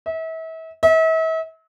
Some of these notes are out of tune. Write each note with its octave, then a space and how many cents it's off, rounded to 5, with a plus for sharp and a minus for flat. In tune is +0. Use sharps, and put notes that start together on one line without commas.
E5 -35
E5 -40